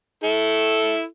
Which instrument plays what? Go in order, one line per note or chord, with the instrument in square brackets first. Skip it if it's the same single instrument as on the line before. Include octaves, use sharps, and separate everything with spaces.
[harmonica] E4 A4